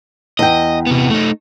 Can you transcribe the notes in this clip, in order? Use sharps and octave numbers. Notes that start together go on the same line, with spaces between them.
E2 D#5 G5
C3 B3
A3 D#4